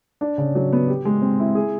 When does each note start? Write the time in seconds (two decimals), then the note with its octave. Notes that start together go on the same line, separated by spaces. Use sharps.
0.21 D4
0.38 C#3
0.55 F#3
0.73 B3
0.88 G4
1.05 G#3
1.22 C4
1.40 E4
1.55 G#4